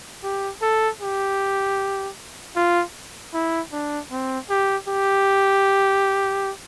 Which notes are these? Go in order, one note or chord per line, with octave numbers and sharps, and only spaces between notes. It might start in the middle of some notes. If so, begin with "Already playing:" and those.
G4
A4
G4
F4
E4
D4
C4
G4
G4